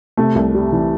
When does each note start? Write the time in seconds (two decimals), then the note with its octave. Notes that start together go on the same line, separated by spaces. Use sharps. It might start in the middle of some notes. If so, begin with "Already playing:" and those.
0.17 C3 A3
0.35 C2
0.54 G3
0.72 E3